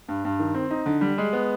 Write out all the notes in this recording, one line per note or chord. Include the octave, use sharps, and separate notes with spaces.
G2
G2
D#3
C4
D#4
D3
G3
G#3
B3